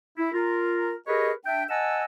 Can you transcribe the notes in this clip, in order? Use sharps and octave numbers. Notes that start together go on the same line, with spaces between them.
E4
F4 A#4
G4 G#4 A#4 B4 C#5 D#5
D4 E5 G5
D#5 F#5 G#5 A5 E6